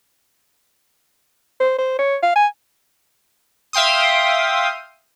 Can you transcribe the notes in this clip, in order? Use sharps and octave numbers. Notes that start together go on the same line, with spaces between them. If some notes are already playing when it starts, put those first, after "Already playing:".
C5
C5
C#5
F5
G#5
E5 F5 G5 C6 D#6